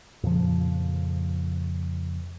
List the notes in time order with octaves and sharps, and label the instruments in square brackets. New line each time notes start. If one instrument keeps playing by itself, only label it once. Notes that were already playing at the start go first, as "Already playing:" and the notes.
[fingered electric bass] F2 A#2 C#3 F3